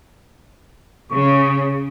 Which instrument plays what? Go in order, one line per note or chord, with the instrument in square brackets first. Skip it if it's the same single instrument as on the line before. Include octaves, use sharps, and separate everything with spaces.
[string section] C#3 [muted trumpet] C#6